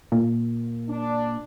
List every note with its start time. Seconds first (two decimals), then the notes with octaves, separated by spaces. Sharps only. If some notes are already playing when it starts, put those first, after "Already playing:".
0.12 A#2
0.88 D4